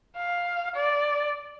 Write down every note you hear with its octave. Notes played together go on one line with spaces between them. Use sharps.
F5
D5